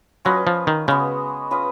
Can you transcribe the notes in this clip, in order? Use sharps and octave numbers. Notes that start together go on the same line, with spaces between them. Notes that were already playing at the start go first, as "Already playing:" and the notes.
F#3 C#4 F4 B4 D#5
F3
D#3
C#3 G#3 B3 F#4
C#4 F4 B4 D#5